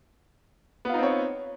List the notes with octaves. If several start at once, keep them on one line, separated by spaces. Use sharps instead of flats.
B3 C4 D#4 F4 C#5